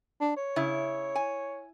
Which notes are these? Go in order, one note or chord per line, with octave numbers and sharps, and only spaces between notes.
D4
C#5
C#3 E4
G#5